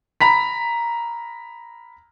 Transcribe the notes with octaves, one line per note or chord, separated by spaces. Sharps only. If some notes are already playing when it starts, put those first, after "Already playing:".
A#5 B5 B6